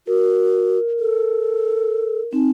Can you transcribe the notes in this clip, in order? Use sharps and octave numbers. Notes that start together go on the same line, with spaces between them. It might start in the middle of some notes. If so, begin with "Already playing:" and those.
F#4 A#4
A4
C4 D#4